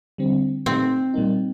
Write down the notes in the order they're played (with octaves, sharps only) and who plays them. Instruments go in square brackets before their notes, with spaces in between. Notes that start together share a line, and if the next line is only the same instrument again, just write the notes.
[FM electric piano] D3 G3 C4
[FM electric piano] A#2 A3 D#4 G4 [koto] C4
[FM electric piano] A#2 G3 A#3 D#4